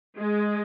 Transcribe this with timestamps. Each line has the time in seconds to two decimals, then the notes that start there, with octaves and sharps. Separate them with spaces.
0.19 G#3